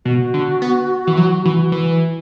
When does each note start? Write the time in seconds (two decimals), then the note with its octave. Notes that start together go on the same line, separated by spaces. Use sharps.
0.05 B2 F#4
0.34 D3
0.62 B3
1.07 E3
1.17 F#3
1.45 E3
1.72 E3